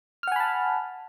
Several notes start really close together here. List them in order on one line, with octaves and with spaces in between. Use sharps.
F6 F#5 G#5 B5 A5